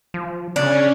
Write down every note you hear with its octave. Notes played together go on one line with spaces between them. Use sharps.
F3
C#3 C#4 D4